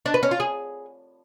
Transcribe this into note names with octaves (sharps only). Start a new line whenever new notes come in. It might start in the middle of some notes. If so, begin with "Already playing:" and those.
D4
B4
C#4
F4
G#4